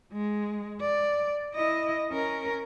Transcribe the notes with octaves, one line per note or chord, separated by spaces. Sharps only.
G#3
D5
E4 D#5
C#4 A#4